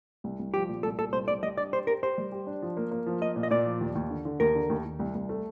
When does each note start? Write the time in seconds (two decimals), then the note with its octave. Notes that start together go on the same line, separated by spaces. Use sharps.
0.24 C2
0.39 C2
0.54 F3 G4
0.69 A#2
0.83 C2 A4
0.98 A#2 A4
1.13 C2 C5
1.28 C2 D5
1.43 G3 D#5
1.58 D4 D5
1.72 G4 C5
1.87 G4 A#4
2.02 G4 C5
2.18 G3
2.32 G4
2.47 D4
2.62 F3
2.77 A#3
2.91 A#3
3.06 F3
3.22 A#3 D#5
3.36 A#2
3.43 D#5
3.51 A#2 D5
3.66 F3
3.81 D#2
3.95 D#2
4.10 D3
4.25 D3
4.40 D#2 A#4
4.55 D3
4.70 D#2
4.85 D#2
4.99 C2
5.15 C2
5.29 A3